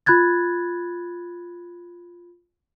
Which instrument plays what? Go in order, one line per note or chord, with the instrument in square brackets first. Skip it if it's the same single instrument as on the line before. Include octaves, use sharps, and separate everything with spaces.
[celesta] F4 B5 F#6 G#6 A6